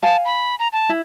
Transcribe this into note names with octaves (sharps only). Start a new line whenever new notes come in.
F5 G#5 A5
B5
A#5
A5
E4